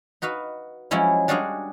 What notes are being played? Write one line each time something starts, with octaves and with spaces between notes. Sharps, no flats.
D#4 F#4 B4 F5
F3 F#3 G#3 C#4 E4
G3 D4 F#4 G#4 F5 F#5